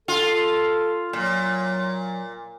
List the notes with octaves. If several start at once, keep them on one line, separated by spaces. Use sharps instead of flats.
F4 A4
A#2 F#3